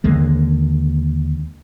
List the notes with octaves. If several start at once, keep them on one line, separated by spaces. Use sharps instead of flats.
D#2 D3 G#3 A#3